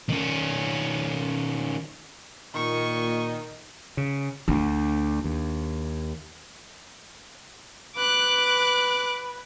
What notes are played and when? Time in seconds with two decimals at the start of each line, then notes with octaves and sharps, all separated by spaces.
0.09 D#3 C#4
2.55 A#2 D#3 D#5 C#6
3.97 C#3
4.48 D2 D4
5.24 D#2
7.97 B4 D6 F#6